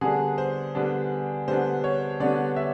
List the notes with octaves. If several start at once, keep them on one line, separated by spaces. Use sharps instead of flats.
D3 G3 B3 D4 G#4
C5
D3 G3 B3 D4
D3 G3 B3 D4 C5
C#5
D3 G3 B3 D4 D5
E5